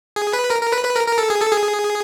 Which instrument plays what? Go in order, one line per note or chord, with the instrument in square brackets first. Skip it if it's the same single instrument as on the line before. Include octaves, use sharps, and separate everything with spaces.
[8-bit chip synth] G#4
B4
A#4
A#4
B4
B4
A#4
A#4
A4
G#4
A4
G#4